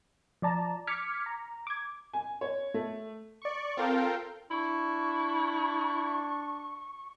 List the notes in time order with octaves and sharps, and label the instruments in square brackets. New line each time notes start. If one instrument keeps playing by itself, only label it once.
[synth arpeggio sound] F3 D5 A5 A#5
D6 F6 G#6 B6 C#7
A#5
D6 G#6
[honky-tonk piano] G#5
C#5
A3
[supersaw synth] D5 C#6
C4 F4 A4 A#4 F5 G5
[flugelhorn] D4 [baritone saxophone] E4 [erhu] C#6